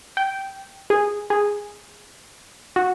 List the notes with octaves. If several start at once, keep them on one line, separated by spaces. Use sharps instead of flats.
G5
G#4
G#4
F#4